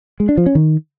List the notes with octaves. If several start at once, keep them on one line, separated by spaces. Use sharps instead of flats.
G#3
D4
F3
C#4
D#3